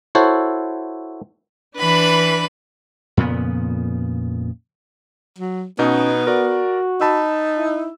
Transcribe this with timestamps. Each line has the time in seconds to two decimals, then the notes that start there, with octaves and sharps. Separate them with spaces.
0.15 E4 F#4 A4 C5 C#5
1.78 E3 D4 B4 B5
3.17 F2 A#2 C#3 B3
5.38 F#3
5.79 B2 B3 C#4 D#4
6.27 F#4 A#4 D5
7.01 D#4 A5 B5 E6
7.58 E4